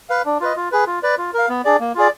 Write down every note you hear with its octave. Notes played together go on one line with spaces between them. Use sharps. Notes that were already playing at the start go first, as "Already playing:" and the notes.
B4 F5
D4
F4 B4 D#5
F4
G#4 B4
F4
B4 D5
F4
A#4 F5
B3
D4 G#4 D5
A#3
F4 G#4 D5